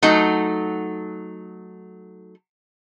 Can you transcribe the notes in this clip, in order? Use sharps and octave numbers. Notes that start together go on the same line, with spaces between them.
F#3 A3 D#4